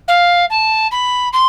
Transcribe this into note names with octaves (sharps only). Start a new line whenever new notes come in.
F5
A5
B5
C6